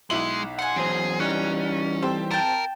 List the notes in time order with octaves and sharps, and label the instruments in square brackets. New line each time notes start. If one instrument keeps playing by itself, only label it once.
[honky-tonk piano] B1 E4 F#7 [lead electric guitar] G#3
[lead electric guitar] F#5 [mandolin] G#5 C6
[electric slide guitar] E2 F#3 C5 [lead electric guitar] G#4
[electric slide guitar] E3 G3 D#4 [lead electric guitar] C#4 [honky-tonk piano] F#6
[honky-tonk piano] C4 G4 C6 [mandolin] A4
[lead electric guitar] A#4 [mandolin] G5 A5